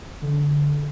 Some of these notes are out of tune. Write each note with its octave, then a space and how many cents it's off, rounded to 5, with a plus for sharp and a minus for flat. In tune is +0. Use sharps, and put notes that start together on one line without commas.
D3 -15